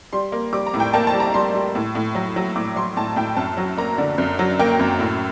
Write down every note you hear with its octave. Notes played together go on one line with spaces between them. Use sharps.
G3 C6
A#3
G3 D6
A#5
A2
G5
A#3 A5
A5
G3
A#5
G3 C6
G3
A2
A2
F#3
F#3
A2 D6
F#3 C6
A2 A5
A2 G5
F#2 A5
F#3
A#3 A#5
D3
F#2
F#3
A#3 G5
F#2
A2